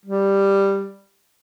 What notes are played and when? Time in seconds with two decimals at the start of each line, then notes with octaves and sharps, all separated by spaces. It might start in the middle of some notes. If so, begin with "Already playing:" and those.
0.06 G3